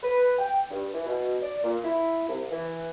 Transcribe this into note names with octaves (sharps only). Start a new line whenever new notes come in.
B4
G5
G2
E3
B2
D5
A#2
E4
C2
E3